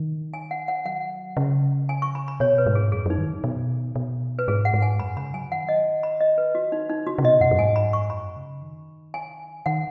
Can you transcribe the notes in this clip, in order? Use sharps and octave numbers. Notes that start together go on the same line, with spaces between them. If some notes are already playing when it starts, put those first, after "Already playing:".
Already playing: D#3
G#5
F#5
F#5
F#3 F#5
C#3
G#5
C#6
B5
B5
B2 C#5
B4
G#2
G#4
F#2 G#4
F#2 D#4
D#3
B2
B2
B4
G#2 G#4
F#5
G#2
G#5
F#2 B5
C#3 B5
F#3 G#5
D#3 F#5
D#5
B5
D#5
B4
F#4
D#4
D#4
C#3 F#4
C#3
B2 D#5
F#2 F#5
F#2
G#2 G#5
B5
C#6
F#2 B5
C#3
D#3
G#5
D#3 F#5